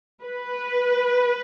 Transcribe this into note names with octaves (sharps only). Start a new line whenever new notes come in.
B4